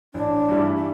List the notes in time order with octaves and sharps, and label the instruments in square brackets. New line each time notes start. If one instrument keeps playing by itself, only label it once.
[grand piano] A1 [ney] D4
[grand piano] G2 E3 G3 E4
[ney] D4